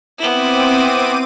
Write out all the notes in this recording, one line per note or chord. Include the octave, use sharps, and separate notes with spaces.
B3 C4 E4 D6 D#7